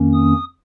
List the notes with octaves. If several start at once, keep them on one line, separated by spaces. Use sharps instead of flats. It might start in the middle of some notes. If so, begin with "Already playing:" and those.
Already playing: F2 D#3 A#3 C#4
D#6